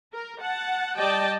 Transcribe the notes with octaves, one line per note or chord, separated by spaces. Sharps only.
A#4
F#5 A5
G3 D5 D#5 G5 A5